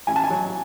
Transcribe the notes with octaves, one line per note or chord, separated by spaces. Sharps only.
A1 G#5
A5
G#5
F#3